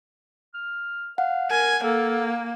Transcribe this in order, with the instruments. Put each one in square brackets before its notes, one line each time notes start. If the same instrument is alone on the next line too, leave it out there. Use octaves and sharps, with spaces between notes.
[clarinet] F6
[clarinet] F5 [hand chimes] F#5
[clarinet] A#4 [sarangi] G#5
[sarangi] A#3 [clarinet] A4